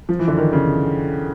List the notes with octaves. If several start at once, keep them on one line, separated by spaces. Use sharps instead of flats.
F3
E3
D3
D#3
C#3